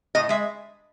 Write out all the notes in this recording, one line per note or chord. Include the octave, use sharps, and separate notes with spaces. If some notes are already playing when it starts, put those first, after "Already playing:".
A2 D#5
G#3 E5